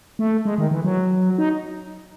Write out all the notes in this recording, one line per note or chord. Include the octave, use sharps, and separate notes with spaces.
A3
G#3
D#3
E3
F#3
D#4